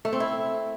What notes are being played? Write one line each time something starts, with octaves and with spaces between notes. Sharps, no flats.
A3
C4
E4